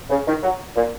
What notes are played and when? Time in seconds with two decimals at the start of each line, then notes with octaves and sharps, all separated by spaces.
0.09 C#3
0.27 D#3
0.42 F#3
0.76 A#2